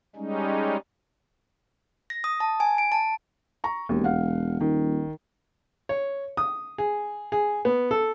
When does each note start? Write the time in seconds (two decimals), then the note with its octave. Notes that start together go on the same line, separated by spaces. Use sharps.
0.16 G3 G#3 C#4 D#4
2.10 A#6
2.24 D#6
2.40 A5
2.60 G#5
2.78 D7
2.92 A5
3.64 A#5 C#6
3.89 E1 D#2
4.04 F5 F#5
4.61 D#1 D#3
5.89 C#5
6.37 D#6
6.78 G#4
7.32 G#4
7.65 B3
7.91 A4